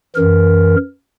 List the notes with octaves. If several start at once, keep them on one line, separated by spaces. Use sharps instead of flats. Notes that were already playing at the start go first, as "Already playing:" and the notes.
F#2 E3 A#4